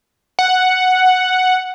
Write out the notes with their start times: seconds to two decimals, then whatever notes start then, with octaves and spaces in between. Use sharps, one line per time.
0.39 F#5